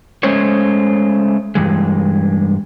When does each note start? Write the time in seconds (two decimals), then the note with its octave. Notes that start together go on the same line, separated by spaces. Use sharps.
0.23 G#3 A3 C#4 C5 C#5
1.55 G2 E3 G#3